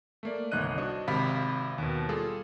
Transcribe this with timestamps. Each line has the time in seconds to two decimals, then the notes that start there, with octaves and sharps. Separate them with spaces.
0.23 A3 A#3 D5
0.51 G1 C2 D#3 D#5 F#6 D#7
0.78 D4 F#4 C5 D#5
1.08 G#1 C3 F5 B5 B6
1.78 D#2 B2
2.09 G3 F4 G#4 A4